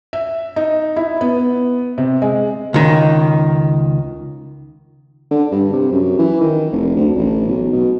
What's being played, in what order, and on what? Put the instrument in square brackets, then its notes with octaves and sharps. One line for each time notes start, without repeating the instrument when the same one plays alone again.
[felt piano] E5
D#4
E4
B3
C3
G#3
[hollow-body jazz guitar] C#2 D#3
[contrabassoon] D3
G2
C3
F#2
E3
D#3
F1
D2
A1
B1
B2